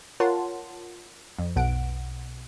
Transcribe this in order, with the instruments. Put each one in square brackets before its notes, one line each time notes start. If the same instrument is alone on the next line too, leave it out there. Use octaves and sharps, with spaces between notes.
[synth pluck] F4 A#4 C#5 F#5 A5 C6
F2
B1 B2 F#5 D7